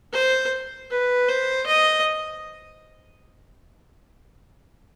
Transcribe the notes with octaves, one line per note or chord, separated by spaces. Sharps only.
C5
B4
C5
D#5